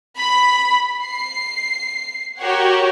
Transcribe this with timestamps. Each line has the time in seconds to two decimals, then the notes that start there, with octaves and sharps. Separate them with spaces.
0.17 B5
1.04 C7
2.39 F#4 G4 A#4 C#5 F#5